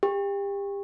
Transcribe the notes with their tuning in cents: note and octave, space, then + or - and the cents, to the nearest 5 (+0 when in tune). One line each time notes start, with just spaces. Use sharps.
G4 +30